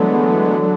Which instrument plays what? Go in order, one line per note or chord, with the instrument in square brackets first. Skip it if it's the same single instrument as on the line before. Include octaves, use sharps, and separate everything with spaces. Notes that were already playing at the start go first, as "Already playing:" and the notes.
Already playing: [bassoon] D3 [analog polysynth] E3 F#3 G#3 A3 B3
[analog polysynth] E3
F#3